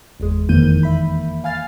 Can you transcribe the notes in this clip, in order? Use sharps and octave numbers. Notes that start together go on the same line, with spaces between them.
G1 E2 G#3
F2 D#3 E3 A#3 G6 D#7
E5 B5
F5 G#5 F6 A6 C7